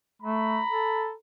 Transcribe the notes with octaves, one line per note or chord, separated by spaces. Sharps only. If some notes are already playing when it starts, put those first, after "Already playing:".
A3 A#5 B5
A4